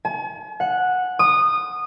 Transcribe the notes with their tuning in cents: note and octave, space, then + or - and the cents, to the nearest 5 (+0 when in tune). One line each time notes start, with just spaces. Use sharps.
G#5 +45
F#5 -10
D#6 -20